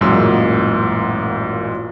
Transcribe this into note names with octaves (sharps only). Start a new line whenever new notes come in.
A1 F#2 A#2 G#3 F4 E6